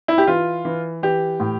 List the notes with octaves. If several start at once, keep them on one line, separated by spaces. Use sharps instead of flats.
E4
G4
E3 F4
E3
E3 G4
A2